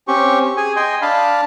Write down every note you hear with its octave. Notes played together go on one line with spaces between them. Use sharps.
C4 C#4 G4 C#6
G#4 G#5
D#5 G5 G#5 C6
D4 F5 A5 B5